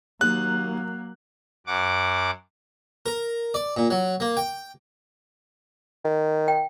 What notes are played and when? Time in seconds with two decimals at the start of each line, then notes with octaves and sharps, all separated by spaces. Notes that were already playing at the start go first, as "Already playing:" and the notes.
0.21 D#2 F#3 A#3 F#6
1.66 F#2 F#5 D6
3.06 A#4
3.54 D5
3.77 A#2
3.90 F#3
4.20 A#3
4.37 G5
6.05 D#3
6.48 G5